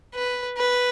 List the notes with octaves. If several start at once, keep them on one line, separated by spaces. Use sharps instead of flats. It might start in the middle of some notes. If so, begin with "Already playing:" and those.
B4
B4